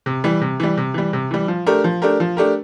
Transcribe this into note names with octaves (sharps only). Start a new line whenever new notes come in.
C3
E3 G3
C3
E3 G3
C3
E3 G3
C3
E3 G3
F3
A3 D4 G4 A#4
F3
A3 D4 G4 A#4
F3
A3 D4 G4 A#4